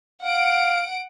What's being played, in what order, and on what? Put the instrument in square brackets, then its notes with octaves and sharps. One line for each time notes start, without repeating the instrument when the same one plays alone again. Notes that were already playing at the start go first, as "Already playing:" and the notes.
[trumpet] F5 [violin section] F#5 D7